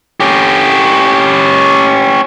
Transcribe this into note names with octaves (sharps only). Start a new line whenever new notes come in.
C#4 G4